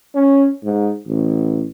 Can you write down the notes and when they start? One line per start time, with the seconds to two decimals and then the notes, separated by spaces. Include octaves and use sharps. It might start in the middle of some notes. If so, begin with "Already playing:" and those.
0.15 C#4
0.64 G#2
1.07 A1